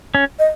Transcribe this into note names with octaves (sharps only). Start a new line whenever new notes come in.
C#4
D#5